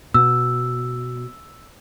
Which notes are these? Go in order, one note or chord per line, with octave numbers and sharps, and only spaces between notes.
B2 E6